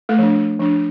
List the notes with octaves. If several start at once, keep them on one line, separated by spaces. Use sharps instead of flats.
A3 A4
F3 D4
F3 D4